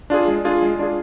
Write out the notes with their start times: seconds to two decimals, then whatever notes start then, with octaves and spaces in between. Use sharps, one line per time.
0.10 D4 F4 G#4
0.28 G#3
0.45 D4 F4 G#4
0.62 G#3
0.79 D4 F4 G#4